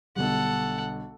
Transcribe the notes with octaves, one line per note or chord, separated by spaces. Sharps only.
B1 D3 G3 A4 F#5